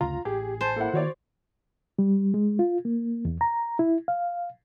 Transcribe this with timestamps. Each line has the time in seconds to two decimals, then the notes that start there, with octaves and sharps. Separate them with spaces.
0.01 F#1 D2 C#3 F4 A#5
0.25 A1 G4 G#4
0.61 C5 G#5 A5
0.76 A#3 E4 A4 F#5
0.93 D#3 F#4 C#5 D5
1.99 G3
2.34 G#3
2.59 F4
2.85 A#3
3.25 E2
3.41 A#5
3.79 E4
4.08 F5